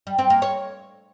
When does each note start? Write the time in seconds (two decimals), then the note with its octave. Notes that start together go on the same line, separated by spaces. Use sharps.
0.07 G3
0.18 C4
0.30 A#3
0.42 C#5